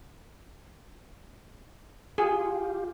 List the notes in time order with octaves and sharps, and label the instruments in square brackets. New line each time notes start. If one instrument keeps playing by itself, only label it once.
[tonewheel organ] F4 G4 [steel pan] G#4